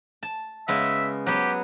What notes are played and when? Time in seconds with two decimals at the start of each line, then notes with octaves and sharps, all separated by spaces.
0.23 A5
0.68 C#3 G#3 B3 E5
1.26 F#3 B3 G4